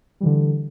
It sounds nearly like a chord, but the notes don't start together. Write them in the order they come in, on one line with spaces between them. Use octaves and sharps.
G3 E3 D3